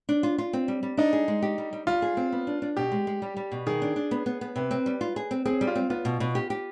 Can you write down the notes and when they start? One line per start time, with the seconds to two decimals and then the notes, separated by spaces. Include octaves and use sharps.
0.09 D4
0.23 F4
0.38 F4
0.53 C4
0.68 G3
0.83 G3
0.97 D4 D#4
1.13 G#4
1.28 G#3
1.42 G4
1.58 G3
1.73 G3
1.87 G3 F4
2.02 G#4
2.17 C4
2.32 B3
2.47 D4
2.62 D4
2.77 B2 G4
2.92 G#3
3.07 G#3
3.22 G3
3.37 G3
3.52 B2
3.66 D#3 G#4
3.82 D4
3.96 D4
4.11 B3
4.26 B3
4.41 B3
4.56 C3 B4
4.71 C4
4.86 G3
5.01 F4
5.16 G#4
5.31 C4
5.46 C4 G#4
5.61 G3
5.67 F4
5.76 C4
5.90 B3 F4
6.05 B2
6.20 B2
6.35 G4
6.50 G4